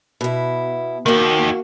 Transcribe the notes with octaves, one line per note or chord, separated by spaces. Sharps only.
B2 E4
D#2 D#3 A#3 F#4